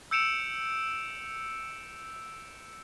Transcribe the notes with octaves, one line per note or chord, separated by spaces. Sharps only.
E6 G6 C#7 D7 E7 F7